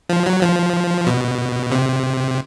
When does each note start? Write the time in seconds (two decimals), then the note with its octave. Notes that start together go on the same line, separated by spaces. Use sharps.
0.09 F3
0.26 F#3
0.42 F3
1.07 B2
1.72 C3